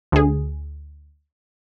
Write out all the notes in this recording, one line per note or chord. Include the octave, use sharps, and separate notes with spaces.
D2 G#4